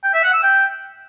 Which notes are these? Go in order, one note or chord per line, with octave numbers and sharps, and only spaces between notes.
G5
E5
F#5
E6
G5